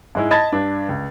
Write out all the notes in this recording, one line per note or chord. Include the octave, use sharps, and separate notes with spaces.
G#2 G#3 E4
D#5 A5 B5 G#6 A6
G2 D4
C#2